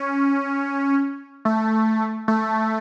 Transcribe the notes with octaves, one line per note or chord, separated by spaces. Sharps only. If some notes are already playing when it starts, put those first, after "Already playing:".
Already playing: C#4
A3
A3